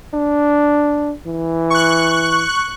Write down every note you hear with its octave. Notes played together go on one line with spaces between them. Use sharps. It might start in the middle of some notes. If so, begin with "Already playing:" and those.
D4
E3
C#6 F#6